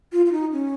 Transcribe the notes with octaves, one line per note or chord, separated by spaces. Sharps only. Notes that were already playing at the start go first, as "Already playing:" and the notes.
F4
F4
D#4
C#4